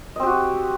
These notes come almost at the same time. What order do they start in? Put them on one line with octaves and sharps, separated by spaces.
D#5 C4 G4 F#4